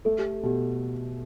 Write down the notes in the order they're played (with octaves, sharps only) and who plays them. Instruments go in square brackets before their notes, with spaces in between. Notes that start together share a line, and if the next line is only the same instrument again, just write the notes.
[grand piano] A3 [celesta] A4
[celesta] G4
[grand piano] B2 [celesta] G4